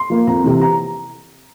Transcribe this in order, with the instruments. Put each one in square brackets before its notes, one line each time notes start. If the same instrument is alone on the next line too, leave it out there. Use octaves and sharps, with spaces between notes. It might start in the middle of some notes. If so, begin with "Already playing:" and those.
Already playing: [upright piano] C6
F3 A#3
F2 A#5
C3 E3
A#5